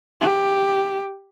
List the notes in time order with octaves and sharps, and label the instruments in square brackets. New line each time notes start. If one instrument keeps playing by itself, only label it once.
[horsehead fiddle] G4